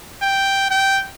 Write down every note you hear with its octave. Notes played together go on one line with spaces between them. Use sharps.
G5
G5